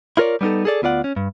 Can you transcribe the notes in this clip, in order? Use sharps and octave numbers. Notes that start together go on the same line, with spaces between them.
E4 F4 A#4 C#5 D5
G3 B3 C#4 D#4 A4
G#4 A4 D5
D2 B3 F4 D5 F#5
C#4
G2